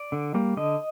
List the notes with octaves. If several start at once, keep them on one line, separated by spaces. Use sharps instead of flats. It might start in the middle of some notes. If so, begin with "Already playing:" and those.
Already playing: D5
D3
G3 A#3
D3 D#5